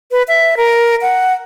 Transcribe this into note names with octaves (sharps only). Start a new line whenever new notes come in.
B4
E5
A#4
F#5